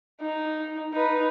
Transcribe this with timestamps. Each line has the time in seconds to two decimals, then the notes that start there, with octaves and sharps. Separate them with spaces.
0.20 D#4
0.93 D#4 B4